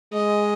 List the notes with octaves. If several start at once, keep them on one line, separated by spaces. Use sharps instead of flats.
G#3 D#5